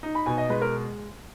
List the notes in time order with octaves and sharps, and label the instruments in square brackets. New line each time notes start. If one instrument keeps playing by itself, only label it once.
[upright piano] D#4
B5
B2 G#5
D#5
G#3 B4
A#4